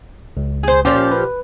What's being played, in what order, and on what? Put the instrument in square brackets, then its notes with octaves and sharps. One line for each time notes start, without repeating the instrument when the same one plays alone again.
[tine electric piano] C#2
[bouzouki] G#4 C5
[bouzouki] A#2 F3 G4 [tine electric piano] C#4
[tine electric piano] B4